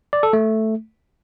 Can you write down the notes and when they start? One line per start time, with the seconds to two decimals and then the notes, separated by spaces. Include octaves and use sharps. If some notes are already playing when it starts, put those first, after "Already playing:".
0.13 D5
0.23 A4
0.33 A3